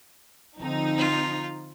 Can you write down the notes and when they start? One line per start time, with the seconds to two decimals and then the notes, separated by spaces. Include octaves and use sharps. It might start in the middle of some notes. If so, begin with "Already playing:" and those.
0.59 D3 F3 C4 D#4
0.98 F4